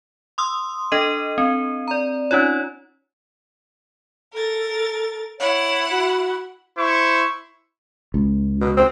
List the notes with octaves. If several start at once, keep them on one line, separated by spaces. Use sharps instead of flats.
C6 D#6 E6
D4 A4 D#5 D#7
C4
D5 A#5
C#4 D#4 F4 C#5
A4 A#4 A6
E4 C#5 F#5
F#4
E4 C5 C#6
C#2
B2
C4